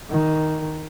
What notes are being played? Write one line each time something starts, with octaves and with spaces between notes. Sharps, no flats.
D#3